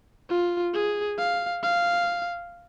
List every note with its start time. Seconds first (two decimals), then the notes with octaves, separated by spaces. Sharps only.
0.29 F4
0.74 G#4
1.18 F5
1.63 F5